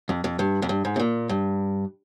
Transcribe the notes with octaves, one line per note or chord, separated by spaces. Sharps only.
F2
F2
G2
F2
G2
G#2
C3
A#2
G2